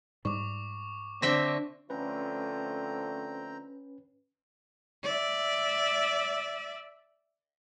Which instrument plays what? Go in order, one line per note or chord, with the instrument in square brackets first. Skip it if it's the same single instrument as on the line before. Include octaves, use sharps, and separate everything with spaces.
[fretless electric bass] G#2 G3 [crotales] C#6 D6
[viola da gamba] D3 [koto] C4 E5 G5 [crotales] A#6
[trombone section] D3 F3 A3 [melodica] C4 G5 A#5 [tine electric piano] C#4 B4
[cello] D5 E5